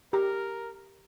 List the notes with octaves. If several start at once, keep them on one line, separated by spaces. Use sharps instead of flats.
G4 A#4 A#5